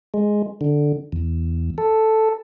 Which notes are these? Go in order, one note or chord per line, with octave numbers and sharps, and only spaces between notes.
G#3
D3
E2
A4